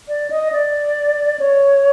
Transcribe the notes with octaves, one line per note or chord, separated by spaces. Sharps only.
D5
D#5
D5
C#5